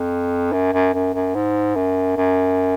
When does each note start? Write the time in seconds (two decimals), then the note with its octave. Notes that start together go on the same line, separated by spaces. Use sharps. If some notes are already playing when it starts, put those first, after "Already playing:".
Already playing: F2
0.52 F#2
0.73 F#2
0.93 F#2
1.14 F#2
1.35 G#2
1.75 F#2
2.17 F#2